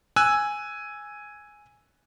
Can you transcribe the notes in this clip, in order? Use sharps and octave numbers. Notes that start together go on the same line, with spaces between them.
G#5 E6 F#6